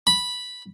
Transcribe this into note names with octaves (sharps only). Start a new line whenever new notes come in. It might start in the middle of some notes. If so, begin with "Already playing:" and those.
B5